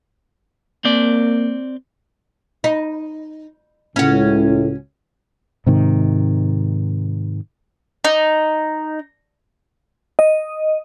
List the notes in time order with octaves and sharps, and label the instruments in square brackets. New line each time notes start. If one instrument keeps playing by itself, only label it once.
[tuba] A#3 [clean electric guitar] C4 D5
[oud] D#4
[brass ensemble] C#2 A2 [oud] C#4 F#4
[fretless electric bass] G#2 C3 D#3
[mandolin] D#4
[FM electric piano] D#5